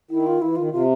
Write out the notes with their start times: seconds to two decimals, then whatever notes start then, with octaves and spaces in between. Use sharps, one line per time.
0.10 D#3 E4
0.26 F4
0.42 E3 E4
0.56 D#3 F4
0.71 C3 F4